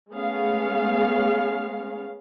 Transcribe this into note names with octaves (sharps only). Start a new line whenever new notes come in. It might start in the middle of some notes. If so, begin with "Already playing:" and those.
G#3 A3 B3 C#4 G#4 F5